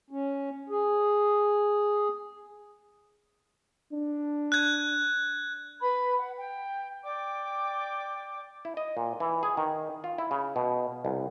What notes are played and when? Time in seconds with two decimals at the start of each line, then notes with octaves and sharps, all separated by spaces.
0.11 C#4
0.70 G#4
3.93 D4
4.52 F#6 G#6
5.81 B4 B5
6.18 F#5
6.36 G5
7.04 D5 G5 D6
8.65 E4
8.77 D#5
8.97 A#2
9.20 E3
9.43 G#4
9.57 D#3
10.04 F4
10.18 E4
10.31 C#3
10.56 B2
11.05 C2